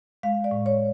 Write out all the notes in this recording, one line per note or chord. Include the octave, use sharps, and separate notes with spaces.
G#3 F5
D5
A2
C#5